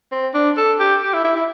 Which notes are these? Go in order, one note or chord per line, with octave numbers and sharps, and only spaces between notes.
C4
D4
A4
G4
G4
E4
E4
E4